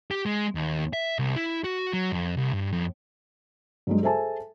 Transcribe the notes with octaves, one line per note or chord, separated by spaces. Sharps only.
G4
G#3
D#2
E5
C2
E4
F#4
F#3
F2
C2
G2
F2
G2 F#3 G#3
G#4 A4 C5 E5 G#5 A5